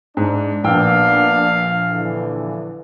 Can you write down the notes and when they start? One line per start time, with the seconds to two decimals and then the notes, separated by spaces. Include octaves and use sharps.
0.17 G#2 D4
0.64 A#1 A#3 B3 D4 F5 G5 E6
1.89 D3 E3